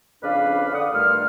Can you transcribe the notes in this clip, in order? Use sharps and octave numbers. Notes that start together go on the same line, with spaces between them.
F2 C#3 D4 B4 D5 F5
D3 F#5 D#6
G2 D#3 A3 F4 F6